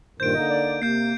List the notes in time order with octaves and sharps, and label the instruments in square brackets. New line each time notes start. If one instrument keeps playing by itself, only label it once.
[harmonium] G2 A#2 D#3 [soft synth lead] C5 [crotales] G6 D7
[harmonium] D3 A#3 D#4 [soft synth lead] D#5
[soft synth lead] D5
[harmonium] C3 [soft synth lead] A#3 [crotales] G6 C7